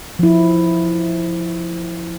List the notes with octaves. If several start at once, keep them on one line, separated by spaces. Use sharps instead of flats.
F3 E4